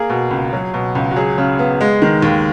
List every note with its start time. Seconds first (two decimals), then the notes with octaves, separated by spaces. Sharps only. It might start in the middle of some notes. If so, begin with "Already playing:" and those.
Already playing: A#3 G#4
0.09 B2
0.31 C#2
0.53 F#3
0.74 B2
0.95 C#2
1.11 F#4
1.16 F#3 G#4
1.38 C#3
1.59 B3
1.81 G#3
2.02 D#3
2.22 D#2